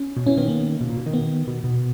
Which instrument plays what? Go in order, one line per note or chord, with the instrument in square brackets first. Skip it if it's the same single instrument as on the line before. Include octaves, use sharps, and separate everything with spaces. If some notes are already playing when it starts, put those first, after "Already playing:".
Already playing: [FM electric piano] C#4
[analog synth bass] B2
[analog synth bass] E3 [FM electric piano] C#4
[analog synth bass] D#3 [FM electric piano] B3
[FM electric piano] A#3
[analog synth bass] B2
A#2
B2
D#3
[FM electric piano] B3
[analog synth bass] B2
B2